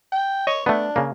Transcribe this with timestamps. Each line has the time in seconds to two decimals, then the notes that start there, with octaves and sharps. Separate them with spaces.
0.12 G5
0.47 C#5 D#5
0.66 A3 B3 D4
0.96 C#3 A#3